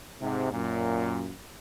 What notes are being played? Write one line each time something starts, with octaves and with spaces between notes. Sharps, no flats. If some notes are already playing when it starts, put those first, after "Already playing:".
G#2 C3
F#2 A#2